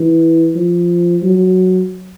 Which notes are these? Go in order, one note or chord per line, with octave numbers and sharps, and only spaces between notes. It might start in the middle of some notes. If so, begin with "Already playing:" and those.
Already playing: E3
F3
F#3